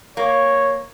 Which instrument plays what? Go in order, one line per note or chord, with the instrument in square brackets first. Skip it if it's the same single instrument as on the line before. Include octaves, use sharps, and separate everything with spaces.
[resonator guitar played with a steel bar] A#3 [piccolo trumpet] C#5